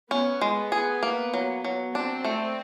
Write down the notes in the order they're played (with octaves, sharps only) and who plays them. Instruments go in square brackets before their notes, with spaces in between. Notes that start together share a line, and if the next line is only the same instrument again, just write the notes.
[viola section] B3 [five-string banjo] C#4
[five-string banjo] G#3
G#4
A#3
F#3
F#3
[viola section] C4 [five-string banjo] D4
[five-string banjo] A3